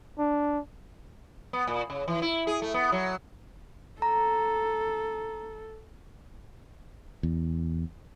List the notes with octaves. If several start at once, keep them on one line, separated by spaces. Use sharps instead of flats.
D4
B3
A#2
C#3
E3
E4
G#4
A3
B3
F#3
A4 A#5
E2